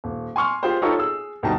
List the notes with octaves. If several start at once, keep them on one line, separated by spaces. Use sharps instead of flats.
D#1
G#5 C6 C#6 F6
F4 G4 G#4 C5
D#4 F4 G4 A4 C#5 C#6
G#4 E6
D2 B2 G3 D#4 G5 A5